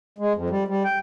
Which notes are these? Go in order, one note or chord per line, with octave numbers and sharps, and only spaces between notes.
G#3
F2
G3
G3
G5